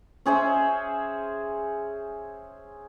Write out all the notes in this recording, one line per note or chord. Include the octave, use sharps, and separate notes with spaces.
C#4 G#4 C5 E5